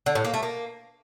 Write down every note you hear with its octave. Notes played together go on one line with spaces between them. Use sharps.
D3
A2
A#3
A3
A#3